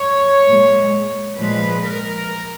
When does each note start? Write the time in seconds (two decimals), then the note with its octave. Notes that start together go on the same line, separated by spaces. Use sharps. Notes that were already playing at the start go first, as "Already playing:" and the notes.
Already playing: C#5
0.48 A#2 G#3
1.38 A#2 F3 G#3 B4
1.83 A#4